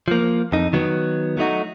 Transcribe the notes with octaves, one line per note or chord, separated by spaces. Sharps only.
F3 A#3
F2 D#4
D#3 F#3 B3
F#3 A3 D#4 F#4